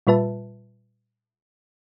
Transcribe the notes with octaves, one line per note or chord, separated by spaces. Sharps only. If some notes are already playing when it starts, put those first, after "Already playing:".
A#2 G3 F4 B4 E5 A5